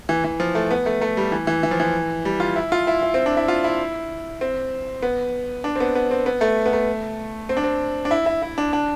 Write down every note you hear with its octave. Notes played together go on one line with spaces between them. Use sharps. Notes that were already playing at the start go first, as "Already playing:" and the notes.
E3
E3
F3
A3
B3
A3
A3
G3
E3
E3
E3
F3
E3
G3
F4
E4
F4
E4
E4
C4
D4
E4
F4
E4
C4
B3
D4
C4
B3
B3
C4
B3
A3
B3
A3
C4
D4
C4
D4
E4
E4
E4
D4
D4